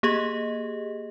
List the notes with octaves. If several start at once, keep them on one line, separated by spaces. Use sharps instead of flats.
A#3 G4 G#4 D#5